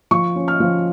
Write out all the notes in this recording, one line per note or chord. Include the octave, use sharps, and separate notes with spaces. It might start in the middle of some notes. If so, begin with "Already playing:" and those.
F3 C#6
C#4
F6
F3